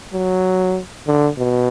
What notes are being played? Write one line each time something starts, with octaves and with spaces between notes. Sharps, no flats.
F#3
D3
B2